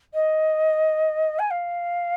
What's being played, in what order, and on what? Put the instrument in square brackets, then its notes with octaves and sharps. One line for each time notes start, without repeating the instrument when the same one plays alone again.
[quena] D#5
G#5
F5